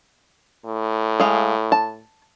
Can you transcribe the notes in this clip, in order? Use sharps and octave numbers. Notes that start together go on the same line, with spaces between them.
A2
G#3 F5
A5